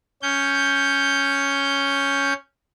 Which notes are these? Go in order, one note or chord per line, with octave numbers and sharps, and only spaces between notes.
C#4 G6